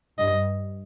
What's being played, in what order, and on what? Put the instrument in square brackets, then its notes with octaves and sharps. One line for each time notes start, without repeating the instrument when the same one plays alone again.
[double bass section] G2 [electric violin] D#5